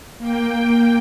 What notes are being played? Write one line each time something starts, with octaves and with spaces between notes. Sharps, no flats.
A#3 G5